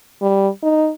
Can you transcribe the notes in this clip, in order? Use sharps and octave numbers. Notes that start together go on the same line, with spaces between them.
G3
D#4